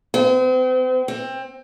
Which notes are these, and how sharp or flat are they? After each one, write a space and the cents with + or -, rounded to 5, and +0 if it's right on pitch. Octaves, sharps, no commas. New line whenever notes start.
C4 -40
C4 +20